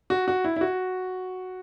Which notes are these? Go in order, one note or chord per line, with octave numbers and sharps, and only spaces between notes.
F#4
F#4
E4
E4
F#4